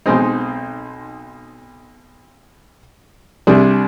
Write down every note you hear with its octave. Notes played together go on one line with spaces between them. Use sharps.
B1 B2 G#3 C4 D#4
C2 C3 G3 D4 G#4